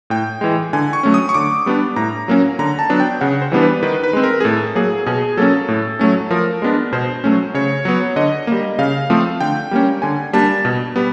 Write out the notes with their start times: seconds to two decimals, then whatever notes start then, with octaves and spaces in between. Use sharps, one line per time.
0.10 A2 G5
0.41 E3 G#3
0.73 D3 G#5
0.93 C#6
1.03 F#3 A3 C#4
1.14 D#6
1.29 C#6
1.34 D3 D6
1.66 G3 B3 D4
1.96 A2 A#5
2.28 F#3 A#3 C#4
2.59 D3 A#5
2.79 A5
2.89 F#3 B3 D4
3.00 G5
3.21 C#3 F#5
3.42 C5
3.52 E3 G3 B3 D4
3.62 B4
3.83 D#3 B4
4.04 B4
4.13 G#3 C4
4.23 A#4
4.40 G#4
4.44 A2 A4
4.75 F#3 A#3 G#4
5.06 B2 G#4
5.37 F#3 A#3 C#4 A4
5.68 A2
5.99 F#3 A3 C#4
6.30 F3 A#4
6.62 G#3 B3 D4
6.93 B2 C5
7.24 F#3 A3 C#4
7.54 C#3 C#5
7.85 F#3 B3
8.16 D3 D#5
8.47 G3 A#3
8.79 C#3 F5
9.10 F3 A3 C4
9.40 D3 G5
9.71 G3 A#3 C#4
10.02 D3 G#5
10.33 G3 A#3 D4 A5
10.65 B2
10.96 G3 B3